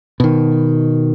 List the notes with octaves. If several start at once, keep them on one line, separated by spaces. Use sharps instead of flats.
B2 D#3